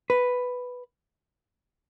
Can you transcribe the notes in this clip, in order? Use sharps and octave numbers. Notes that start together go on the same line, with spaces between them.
B4